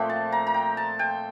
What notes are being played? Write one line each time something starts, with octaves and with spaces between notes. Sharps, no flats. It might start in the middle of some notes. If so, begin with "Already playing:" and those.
Already playing: A#2 F3 A3 C4 G5
A5
A#5
A#5
G5
A5
G5